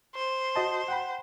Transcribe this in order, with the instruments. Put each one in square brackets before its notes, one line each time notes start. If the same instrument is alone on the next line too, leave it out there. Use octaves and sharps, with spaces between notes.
[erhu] C5
[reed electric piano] F#4 D#5 A5
F#5 G5 B5